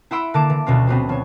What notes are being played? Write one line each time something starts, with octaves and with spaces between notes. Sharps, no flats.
E4 F#5 B5 C6 E6 D7
D3 A#3 A5 D6 D7
E3
D2 B2 C#4 F4
F3 F#3 B3 C4
F3 C#5